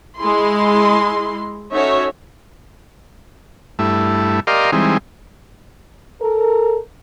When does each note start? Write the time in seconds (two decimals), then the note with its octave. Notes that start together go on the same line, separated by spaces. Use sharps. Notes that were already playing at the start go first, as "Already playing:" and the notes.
0.17 G#3 E4 C6
1.72 C#4 D#4 F#4 A4 C#5 E5
3.79 G2 A3 E4
4.47 G4 A#4 D5 D#5 F5 C6
4.72 E3 G3 G#3 C4 D#4
6.22 A4 A#4